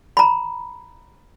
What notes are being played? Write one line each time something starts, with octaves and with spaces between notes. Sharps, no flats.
A#5 B5